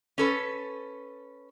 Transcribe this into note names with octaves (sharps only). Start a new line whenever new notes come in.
C#4 A4 B4